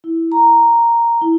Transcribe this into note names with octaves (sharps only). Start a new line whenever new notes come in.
E4
A#5
E4